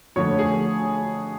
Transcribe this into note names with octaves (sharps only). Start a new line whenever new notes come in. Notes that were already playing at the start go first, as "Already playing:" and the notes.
F2 D3 F3 A3 C#5
G#4